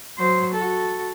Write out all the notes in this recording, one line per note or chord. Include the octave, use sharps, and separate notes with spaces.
F#3 C5
F#4 A4